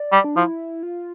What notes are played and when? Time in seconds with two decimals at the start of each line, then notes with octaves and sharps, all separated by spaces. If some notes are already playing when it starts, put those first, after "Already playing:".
Already playing: D5
0.12 G3
0.24 D4
0.36 F3 E4
0.83 F4